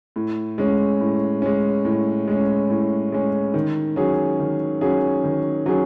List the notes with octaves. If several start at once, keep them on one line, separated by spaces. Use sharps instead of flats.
A2
G#3 C#4
A2
G#3 C#4
A2
G#3 C#4
A2
G#3 C#4
D#3
F#3 C#4 G#4
D#3
F#3 C#4 G#4
D#3
F#3 C#4 G#4